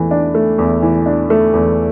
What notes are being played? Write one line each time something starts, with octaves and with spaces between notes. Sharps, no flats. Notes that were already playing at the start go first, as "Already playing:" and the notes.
Already playing: E2 E3 A3
D4
A3
E2
E3
D4
A3
E2